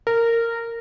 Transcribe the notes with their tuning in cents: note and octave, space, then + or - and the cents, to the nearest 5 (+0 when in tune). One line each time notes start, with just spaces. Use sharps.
A#4 -15